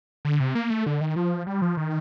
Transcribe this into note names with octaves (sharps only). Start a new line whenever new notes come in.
D3
C3
A#3
A3
D3
D#3
F3
G3
F3
D#3